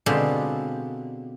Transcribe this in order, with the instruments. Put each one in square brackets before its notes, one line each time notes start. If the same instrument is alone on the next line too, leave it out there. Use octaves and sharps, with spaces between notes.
[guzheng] B2 D3 G#3 C4 F4 G4